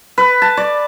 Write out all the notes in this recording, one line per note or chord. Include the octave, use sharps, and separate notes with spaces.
B4
A5
D5